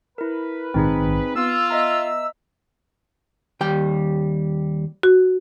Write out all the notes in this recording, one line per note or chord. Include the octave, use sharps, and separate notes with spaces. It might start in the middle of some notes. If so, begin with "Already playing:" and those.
E4 A#4 B4
A#1 G#2 D#3 C4 D#4 G#4
B3 F4 E6
D#5 E5 A#5
D#2 G3 G5
F#4